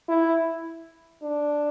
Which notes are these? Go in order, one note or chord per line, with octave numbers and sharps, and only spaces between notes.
E4
D4